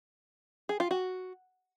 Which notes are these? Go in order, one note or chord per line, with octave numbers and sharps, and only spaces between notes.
G#4
F4
F#4